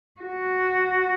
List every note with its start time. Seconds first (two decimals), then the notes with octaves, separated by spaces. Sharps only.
0.21 F#4